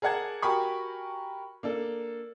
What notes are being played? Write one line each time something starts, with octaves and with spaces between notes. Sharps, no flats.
G#4 A#4 D5 F#5 A5 G#6
F#4 G4 A#4 G#5 B5 C#6
A#3 D4 A4